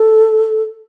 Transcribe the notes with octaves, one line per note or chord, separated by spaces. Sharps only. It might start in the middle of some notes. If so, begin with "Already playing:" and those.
Already playing: A4